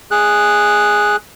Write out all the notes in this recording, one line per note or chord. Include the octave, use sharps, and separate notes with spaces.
G#4 F#6